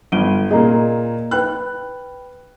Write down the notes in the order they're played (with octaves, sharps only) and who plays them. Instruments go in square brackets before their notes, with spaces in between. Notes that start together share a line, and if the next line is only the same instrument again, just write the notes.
[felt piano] G1 [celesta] D7 D#7 G7
[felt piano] A#2 A#3 G#4 [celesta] D#5 A#5
[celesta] B4 G5 B5 [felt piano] F#6